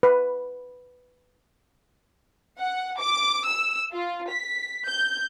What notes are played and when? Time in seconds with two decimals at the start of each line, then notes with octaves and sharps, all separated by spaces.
0.03 B4
2.59 F#5
3.00 D6
3.46 E6
3.93 F4
4.31 B6
4.88 G6